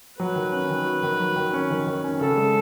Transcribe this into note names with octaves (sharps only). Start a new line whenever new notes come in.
F#3 B4
D#3
C#4
D#3
F#4
D#3
F#3
D#3
C#4
D#3
D#3
C#4
C#3 A4
G#3